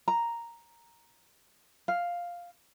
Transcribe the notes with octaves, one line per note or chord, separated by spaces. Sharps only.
A#5
F5